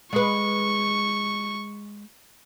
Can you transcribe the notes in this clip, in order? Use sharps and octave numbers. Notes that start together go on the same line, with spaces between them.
G#3 B4 C#6